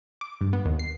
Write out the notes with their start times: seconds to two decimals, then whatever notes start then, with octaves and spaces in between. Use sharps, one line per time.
0.21 D6
0.41 G2
0.53 B3
0.65 D#2
0.79 C7